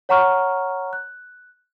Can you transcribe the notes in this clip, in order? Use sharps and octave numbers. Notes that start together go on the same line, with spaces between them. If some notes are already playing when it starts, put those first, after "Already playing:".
C#5 F#5 A#5 C#6 F6
F#6